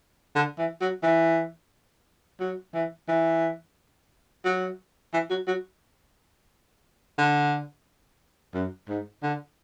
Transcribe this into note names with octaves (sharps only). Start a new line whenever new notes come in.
D3
E3
F#3
E3
F#3
E3
E3
F#3
E3
F#3
F#3
D3
F#2
G#2
D3